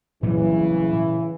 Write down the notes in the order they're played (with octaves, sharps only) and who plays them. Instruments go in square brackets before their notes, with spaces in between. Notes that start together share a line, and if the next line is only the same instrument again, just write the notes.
[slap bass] A#2 F#3 G3 [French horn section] C#3 E3